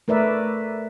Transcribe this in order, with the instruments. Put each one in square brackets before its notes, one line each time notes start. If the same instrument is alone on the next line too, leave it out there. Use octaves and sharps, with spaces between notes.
[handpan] A3 A#4 B4 D5 E5